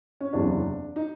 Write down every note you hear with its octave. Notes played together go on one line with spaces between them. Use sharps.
C#4
F#1 E2 C3 D4
D#4